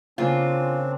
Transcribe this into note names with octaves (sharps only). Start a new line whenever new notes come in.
C#3 A#3 C4 D4 F4 G#5